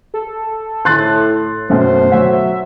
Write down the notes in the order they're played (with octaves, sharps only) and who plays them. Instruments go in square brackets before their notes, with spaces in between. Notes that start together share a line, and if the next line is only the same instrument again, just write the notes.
[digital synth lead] A4
[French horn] A2 [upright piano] C6 F#6 A6
[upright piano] F#2 B2 [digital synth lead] A3 [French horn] C5
[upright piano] F#3 C#5 F#5 [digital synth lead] E5